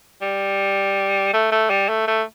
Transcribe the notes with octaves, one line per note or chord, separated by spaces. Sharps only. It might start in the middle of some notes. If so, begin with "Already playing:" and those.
G3
A3
A3
G3
A3
A3